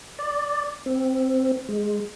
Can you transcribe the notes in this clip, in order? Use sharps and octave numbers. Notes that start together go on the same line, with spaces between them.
D5
C4
G#3